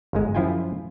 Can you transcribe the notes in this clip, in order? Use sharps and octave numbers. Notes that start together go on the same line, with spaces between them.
G1 G#2 G#3
F#2 F3 E4 F4 G5 G#5